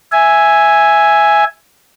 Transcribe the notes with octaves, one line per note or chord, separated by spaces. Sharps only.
E5 G#5